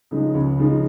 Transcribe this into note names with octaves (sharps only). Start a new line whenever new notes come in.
C#3 F3 G#3 D#4
C#2
C#3 F3 G#3 D#4